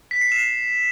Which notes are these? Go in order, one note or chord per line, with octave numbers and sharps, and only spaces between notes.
B6
C7
E7